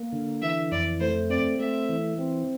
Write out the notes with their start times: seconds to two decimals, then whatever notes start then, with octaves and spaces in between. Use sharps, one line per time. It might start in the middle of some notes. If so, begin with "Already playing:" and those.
Already playing: A#3
0.12 D3
0.42 E3 E5
0.72 F2 D5
1.01 A3 C5
1.30 C4 D5
1.60 A3 E5
1.89 E3
2.19 C4